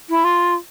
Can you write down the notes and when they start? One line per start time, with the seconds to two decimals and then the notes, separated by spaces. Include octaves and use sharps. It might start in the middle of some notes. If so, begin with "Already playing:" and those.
0.09 E4
0.24 F4